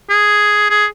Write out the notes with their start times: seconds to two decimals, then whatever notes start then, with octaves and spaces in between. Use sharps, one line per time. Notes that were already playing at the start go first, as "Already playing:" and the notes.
0.10 G#4
0.70 G#4